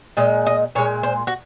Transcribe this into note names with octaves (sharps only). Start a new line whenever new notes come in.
A#2 G#3 D#5
D#5
A#2 G#3 C#5
C5
F#4